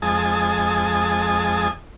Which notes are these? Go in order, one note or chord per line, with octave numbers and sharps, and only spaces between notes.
F2 G#3 G#5 A5 D#6